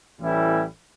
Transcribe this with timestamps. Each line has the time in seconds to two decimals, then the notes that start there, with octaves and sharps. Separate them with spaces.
0.19 A1 A2 E3 G3 E4